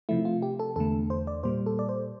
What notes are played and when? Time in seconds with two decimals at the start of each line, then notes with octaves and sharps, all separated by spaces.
0.09 C3 F3 A3 E4
0.25 F4
0.42 G4
0.59 A4
0.76 E2 D3 A3 A4
1.10 C5
1.27 D5
1.43 A#2 G3 A#3 C5
1.66 A4
1.79 D5
1.89 C5